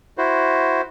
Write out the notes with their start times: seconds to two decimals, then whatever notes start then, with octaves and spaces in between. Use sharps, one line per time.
0.18 E4 F#4 C5